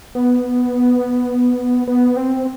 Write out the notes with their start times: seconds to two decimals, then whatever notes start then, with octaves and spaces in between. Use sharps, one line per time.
0.15 B3
1.88 B3
2.17 C4